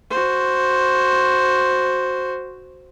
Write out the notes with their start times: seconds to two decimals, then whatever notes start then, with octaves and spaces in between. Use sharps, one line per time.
0.10 F#4 C5